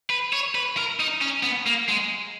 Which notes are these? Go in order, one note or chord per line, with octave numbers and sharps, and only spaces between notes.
B4
C#5
B4
A#4
D#4
C#4
B3
A#3
G#3